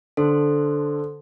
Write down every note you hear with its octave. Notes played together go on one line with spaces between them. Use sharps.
D3 A4 C5 C6